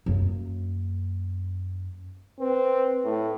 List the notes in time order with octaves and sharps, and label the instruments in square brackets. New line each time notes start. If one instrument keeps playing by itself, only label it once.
[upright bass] F#2 A#3
[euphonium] C4 [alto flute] B4
[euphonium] A2